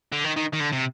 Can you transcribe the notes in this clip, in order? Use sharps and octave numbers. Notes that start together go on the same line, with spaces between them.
D3
D#3
D#3
D#3
D3
C3